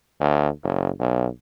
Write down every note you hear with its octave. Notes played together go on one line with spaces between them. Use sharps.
D2
F#1
B1